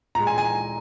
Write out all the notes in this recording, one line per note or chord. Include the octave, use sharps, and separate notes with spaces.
A#2 G#3 A#5
G#5
G#5